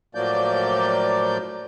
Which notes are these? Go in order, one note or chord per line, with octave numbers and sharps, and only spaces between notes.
A2 F3 F#3 A#3 D5 G6